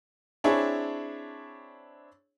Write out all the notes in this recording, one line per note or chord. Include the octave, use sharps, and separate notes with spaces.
C4 D4 E4 G#4 C#5